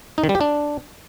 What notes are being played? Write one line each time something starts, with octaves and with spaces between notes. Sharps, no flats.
D#4
D#3
G3
G4
D4